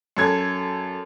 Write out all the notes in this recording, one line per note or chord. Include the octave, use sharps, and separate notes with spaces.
F#2 A4 G#6